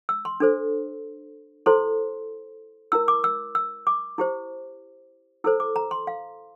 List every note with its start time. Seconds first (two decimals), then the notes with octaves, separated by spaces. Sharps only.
0.09 E6
0.25 C6
0.40 D4 A4 C5
1.66 E4 A4 C5 C6
2.92 E4 A#4 E6
3.08 D6
3.24 E6
3.55 E6
3.87 D6
4.18 E4 G4 C5
5.44 E4 A4 C5 E6
5.60 D6
5.76 A#5
5.91 C6
6.07 F5